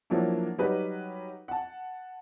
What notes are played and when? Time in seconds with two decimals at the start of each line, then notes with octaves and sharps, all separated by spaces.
0.10 F3 F#3 A#3 D4 E4
0.58 F#3 G3 D#4 G4 B4
1.48 F#5 A5